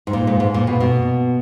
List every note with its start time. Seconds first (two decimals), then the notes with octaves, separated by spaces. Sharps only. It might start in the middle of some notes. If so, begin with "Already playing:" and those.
0.07 G#2
0.13 A#2
0.27 G#2
0.40 G#2
0.54 A#2
0.67 B2
0.80 B2